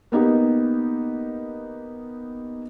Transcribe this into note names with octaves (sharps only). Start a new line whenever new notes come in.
A#3 B3 D#4 G4